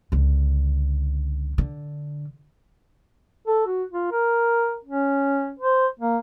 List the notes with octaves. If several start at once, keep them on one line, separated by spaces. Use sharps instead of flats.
C#2 D3
D3
A4
F#4
F4
A#4
C#4
C5
A#3